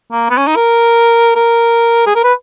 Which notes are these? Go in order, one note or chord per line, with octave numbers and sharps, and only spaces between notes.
A#3
B3
C#4
D#4
A#4
A#4
G#4
A#4
B4